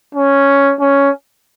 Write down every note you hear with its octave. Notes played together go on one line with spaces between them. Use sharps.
C#4
C#4